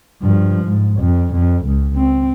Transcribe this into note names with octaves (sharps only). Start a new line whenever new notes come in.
G2 F3
G#2
F2
F2
C#2
C4